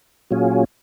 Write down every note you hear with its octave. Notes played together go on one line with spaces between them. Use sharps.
A#2 F#3 C#4 F4 G#4